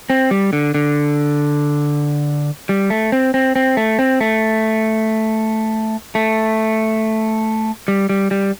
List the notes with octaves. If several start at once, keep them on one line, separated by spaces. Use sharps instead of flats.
C4
G3
D3
D3
G3
A3
C4
C4
C4
A3
C4
A3
A3
G3
G3
G3